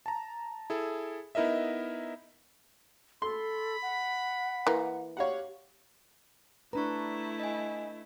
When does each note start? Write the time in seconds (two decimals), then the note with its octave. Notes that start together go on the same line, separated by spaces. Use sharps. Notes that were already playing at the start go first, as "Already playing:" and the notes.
0.06 A5 A#5
0.70 E4 G#4 A4
1.35 B3 D#4 E4 A#4 D#5 E5
3.22 A4 B5 C6
3.82 F#5
4.67 E3 A#3
5.17 G4 C#5 F5 F#5
6.73 A3 D4 E4 B4 A#5 C#6
7.40 D#5 G#5